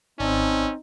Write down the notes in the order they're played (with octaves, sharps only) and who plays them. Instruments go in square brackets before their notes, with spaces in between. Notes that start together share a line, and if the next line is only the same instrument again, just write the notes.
[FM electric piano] G#1 D5 A5 [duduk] C4 [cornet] C#4 [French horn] D#4